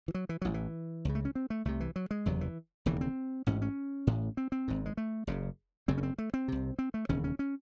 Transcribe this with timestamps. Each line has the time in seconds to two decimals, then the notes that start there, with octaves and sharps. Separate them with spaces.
0.08 E3
0.14 F#3
0.29 E3
0.42 A1 A2 F#3
0.54 E3
1.05 C#2 C#3
1.15 A3
1.25 C#4
1.35 C4
1.50 A3
1.65 C2 C3 A3
1.80 E3
1.96 F#3
2.11 G#3
2.26 F#1 E2 C3 F#3
2.41 E3
2.86 E1 D#2 C#3 E3
3.01 C4
3.47 A1 G#2 C#4
3.62 C#4
4.07 A1 A2
4.37 C4
4.52 C4
4.68 G#1 G#2
4.86 G#3
4.97 A3
5.27 F#1 F#2 C#3
5.88 F#1 F#2 C#3 C4
5.98 C#4
6.03 C4
6.18 A3
6.34 C4
6.48 C2 C3
6.79 C4
6.94 A3
7.09 E1 D#2 C#3 C#4
7.24 C#4
7.39 C#4